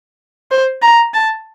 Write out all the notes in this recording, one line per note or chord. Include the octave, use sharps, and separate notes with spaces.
C5
A#5
A5